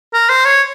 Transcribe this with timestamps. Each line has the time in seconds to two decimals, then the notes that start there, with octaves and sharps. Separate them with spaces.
0.14 A#4
0.29 C5
0.45 C#5